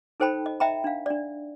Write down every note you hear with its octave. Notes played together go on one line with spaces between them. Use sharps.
D#4 A4 C5 G5 A5 B5
D#5
D#5 E5 G5 A#5 B5
D4 F5
D4 D5